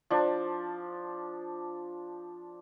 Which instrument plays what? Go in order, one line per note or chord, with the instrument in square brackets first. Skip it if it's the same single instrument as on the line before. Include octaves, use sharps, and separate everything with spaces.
[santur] F3 D4